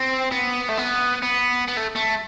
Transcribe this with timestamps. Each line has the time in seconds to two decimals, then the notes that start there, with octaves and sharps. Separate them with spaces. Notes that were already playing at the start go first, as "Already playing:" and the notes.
Already playing: C4
0.32 B3
0.69 A3
0.77 B3
1.23 B3
1.68 B3
1.77 A3
1.96 A3